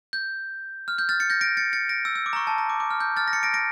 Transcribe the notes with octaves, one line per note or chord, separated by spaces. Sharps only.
G6
F6
G6
F6 A6
A6 C#7
G6 A#6
A#6 D7
A6 C#7
A6 C#7
A#6 D7
E6
E6
D6
A#5
C#6
A5
A#5
D6
D6
F6
G6
F6 A6
A#6
A6 C#7
A#6 D7
A#6 D7